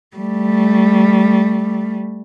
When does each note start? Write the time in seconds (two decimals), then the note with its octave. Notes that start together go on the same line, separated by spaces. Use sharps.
0.16 G3 A3